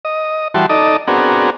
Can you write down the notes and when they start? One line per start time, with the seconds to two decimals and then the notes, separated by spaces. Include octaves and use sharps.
0.05 D#5
0.54 E3 G3 F#4 A5 C6
0.69 D#4 A4 D5 D#5
1.07 B3 C4 D4 F#4 G#4 A#4